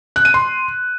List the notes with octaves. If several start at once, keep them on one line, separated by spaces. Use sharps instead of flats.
F#6
D#7
C6